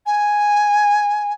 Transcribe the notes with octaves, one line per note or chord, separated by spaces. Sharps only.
G#5